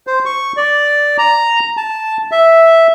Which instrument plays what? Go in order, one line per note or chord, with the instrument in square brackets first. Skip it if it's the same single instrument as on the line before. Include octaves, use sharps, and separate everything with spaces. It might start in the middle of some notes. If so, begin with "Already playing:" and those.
[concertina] C5
C#6
D5
A#5
A5
E5